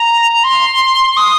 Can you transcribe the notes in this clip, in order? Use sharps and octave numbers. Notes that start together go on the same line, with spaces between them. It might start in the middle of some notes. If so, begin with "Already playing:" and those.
Already playing: A#5
C6
D#6